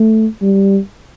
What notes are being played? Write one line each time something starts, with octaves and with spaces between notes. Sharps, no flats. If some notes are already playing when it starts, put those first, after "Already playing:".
Already playing: A3
G3